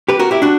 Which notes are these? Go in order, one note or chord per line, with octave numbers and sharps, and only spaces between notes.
G4 B4
F#4 A#4
E4 G4
D4 F#4